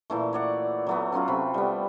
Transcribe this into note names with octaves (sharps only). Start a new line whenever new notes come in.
A#2 E3 A3
C#5 D5 F#5
F#3 A3 B3
F#3 C#4 F4 F#4
C3 B5
G3 B3